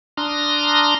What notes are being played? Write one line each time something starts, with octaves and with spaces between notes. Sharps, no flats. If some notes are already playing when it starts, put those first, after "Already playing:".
D4 A#5 C6 D#6 F6 A#6